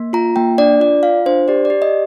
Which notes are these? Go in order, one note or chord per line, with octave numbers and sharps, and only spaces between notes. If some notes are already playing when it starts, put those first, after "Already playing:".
Already playing: A#3
F4 A#5
A#3 G5
D4 D5
F4 D5
F4 F5
D4 C5
G4 D5
D5
G4
D#5